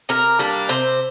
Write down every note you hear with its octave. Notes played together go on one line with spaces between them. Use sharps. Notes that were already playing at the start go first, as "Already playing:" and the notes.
C3 A#4
G3 A#3 D4
C3 C5